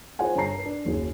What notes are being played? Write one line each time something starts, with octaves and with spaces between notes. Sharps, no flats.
F4 G#4 C5 C#5 F#5 G#5
G1 G#4 C#5 A5 A#5 C7
A#4 B4
D4
F#1 D#2 F#3 G#4